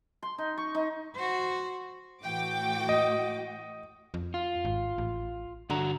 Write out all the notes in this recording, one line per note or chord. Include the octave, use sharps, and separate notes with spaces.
C6
D#4
C#6
D#4
F#4 C5
A2 E3 A3 F#4 G5 D6
D#5
F2
F4
G#1
A1
G2 D3 F#4 A#5